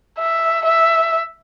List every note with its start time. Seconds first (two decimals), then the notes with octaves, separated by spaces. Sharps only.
0.18 E5
0.66 E5